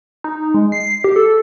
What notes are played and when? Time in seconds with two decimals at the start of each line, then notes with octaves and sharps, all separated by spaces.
0.24 D#4
0.54 G#3
0.72 C7
1.04 G4
1.16 A4